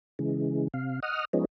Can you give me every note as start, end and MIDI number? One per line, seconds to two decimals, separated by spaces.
0.19 0.68 49
0.19 0.68 52
0.19 0.68 56
0.74 1.00 48
0.74 1.00 77
1.03 1.25 75
1.03 1.25 78
1.03 1.25 87
1.03 1.25 89
1.33 1.45 53
1.33 1.45 56
1.33 1.45 59
1.33 1.45 61
1.33 1.45 63